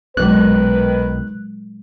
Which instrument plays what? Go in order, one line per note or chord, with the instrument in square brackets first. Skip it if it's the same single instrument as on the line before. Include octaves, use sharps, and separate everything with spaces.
[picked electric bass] B1 [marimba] A#2 F#3 G#3 [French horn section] D#3 B4 [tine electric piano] F#6